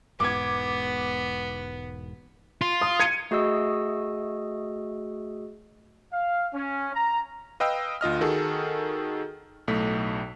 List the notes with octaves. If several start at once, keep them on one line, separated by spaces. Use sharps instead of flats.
E1 G#2 B3 D6 G#6
F4
D#6
G#6 C#7 D#7
A3 F#4 G#4 D#5 E6
F5
C#4
A#5
B4 D#5 F5 G5 E6
D2 F4 D#5 F6
D#3 F#4 G#4 A4
B1 A2 A3 B6